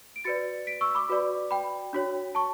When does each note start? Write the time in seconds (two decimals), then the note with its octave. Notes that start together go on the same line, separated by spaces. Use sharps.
0.16 D7
0.24 F#4 B4 D5 A6 C#7
0.67 B6 D7
0.81 C#6 E6
0.95 B5 D6
1.09 F#4 B4 D5
1.51 G5 B5
1.93 D4 F#4 C#5
2.35 A5 C#6